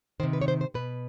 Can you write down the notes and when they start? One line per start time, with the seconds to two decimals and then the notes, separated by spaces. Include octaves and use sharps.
0.20 C3 D#3 C5
0.33 B4
0.41 C#5
0.48 C5
0.61 C5
0.74 B2 B4